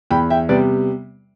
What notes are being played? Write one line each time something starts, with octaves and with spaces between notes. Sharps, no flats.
E2 G5 B5
E5 G5
C3 G3 B3 B4 D5